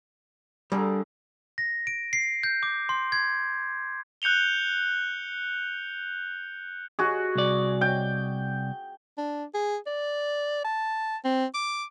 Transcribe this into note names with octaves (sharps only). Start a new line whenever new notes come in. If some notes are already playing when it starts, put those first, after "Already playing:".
D3 G3 G#4 A#4
A#6
D7
C7
G6
D6
C6
G#6
F#6 G6 C#7 F7 G7
F#4 G#4
C2 D5
G5
D4
G#4
D5
A5
C4
D6